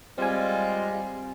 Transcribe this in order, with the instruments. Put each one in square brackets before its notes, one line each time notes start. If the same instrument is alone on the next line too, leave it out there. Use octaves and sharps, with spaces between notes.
[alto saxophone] G3 [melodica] G#3 F4 [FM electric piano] C4 G#5